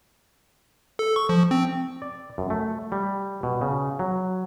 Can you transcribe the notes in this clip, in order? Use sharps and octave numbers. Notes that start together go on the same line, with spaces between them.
A4
C#6
F3
C4
D5
F#2
A3
G3
B2
C#3
F#3